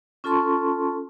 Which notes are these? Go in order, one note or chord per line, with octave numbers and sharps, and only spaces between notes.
C#4 F4 A4 A5 C6 C#6